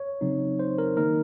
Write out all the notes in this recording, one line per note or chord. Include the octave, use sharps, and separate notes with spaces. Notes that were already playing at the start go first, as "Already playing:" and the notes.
Already playing: C#5
C#3 F#3 C4 D#4
C5
A#4
D#3 A#3 D#4 A#4